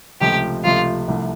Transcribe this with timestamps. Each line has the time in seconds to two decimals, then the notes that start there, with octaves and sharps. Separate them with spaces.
0.21 C#2 C3 F3 A3 G4
0.64 C#2 C3 F3 A3 F4
1.08 C2 C3 F3 A3